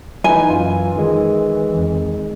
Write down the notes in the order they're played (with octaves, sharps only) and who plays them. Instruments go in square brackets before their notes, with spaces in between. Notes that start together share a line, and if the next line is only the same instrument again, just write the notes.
[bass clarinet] E3 [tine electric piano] D#4 E4 B4 [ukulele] G#5
[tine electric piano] F#2 F4
D#3 G#3
[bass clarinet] F2